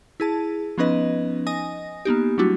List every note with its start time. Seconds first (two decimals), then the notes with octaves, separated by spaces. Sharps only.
0.20 E4 G#4 A5
0.78 F3 B3 C#4 D#4 B4 D#5
1.47 D#5 G#5 D#6 A#6
2.05 A#3 B3 D#4 G4
2.38 F#3 G3 A3 D4 E4 F#4